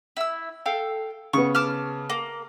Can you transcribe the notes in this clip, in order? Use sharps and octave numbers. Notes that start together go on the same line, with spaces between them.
E4 E6
A4 F5 G5
C#3 B3 C#6
A5 D6 F6
A#3